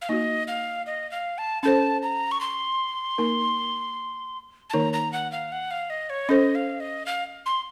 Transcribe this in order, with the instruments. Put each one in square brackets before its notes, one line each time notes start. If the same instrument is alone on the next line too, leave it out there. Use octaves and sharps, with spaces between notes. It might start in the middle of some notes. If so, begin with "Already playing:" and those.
[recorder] F5
[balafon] A#3 D#4 F#4 [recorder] D#5
[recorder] F5
D#5
F5
A5
[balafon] C#4 A4 C5 [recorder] A5
[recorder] A#5
C#6
C6
[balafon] A#3 D#4 A#4
[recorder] A5
[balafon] D#3 A#3 D#4 A#4 C#5 [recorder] A#5
[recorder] A#5
F#5
F5
F#5
F5
D#5
C#5
[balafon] C#4 A4 C5 [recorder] D#5
[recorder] F5
D#5
F5
C6